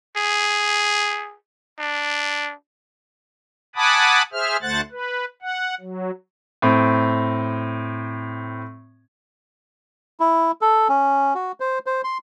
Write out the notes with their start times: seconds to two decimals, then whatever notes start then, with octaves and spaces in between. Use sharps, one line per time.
0.17 G#4
1.79 D4
3.76 F#5 G#5 A5 B5 D6 D#6
4.33 G#4 C5 E5 F6
4.62 D2 A3 C5 F#5 F#6 A6
4.91 B4
5.42 F#5
5.81 F#3
6.62 A2 C4
10.20 E4
10.61 A4
10.89 C#4
11.35 F#4
11.60 C5
11.86 C5
12.04 C6